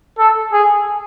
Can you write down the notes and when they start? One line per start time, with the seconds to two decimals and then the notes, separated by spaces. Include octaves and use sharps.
0.18 A4
0.53 G#4